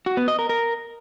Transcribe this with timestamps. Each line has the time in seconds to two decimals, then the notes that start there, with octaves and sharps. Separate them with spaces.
0.06 F#4
0.17 B3
0.28 D#5
0.39 A#4
0.49 A#4